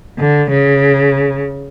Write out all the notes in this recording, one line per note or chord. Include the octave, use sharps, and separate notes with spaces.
D3
C#3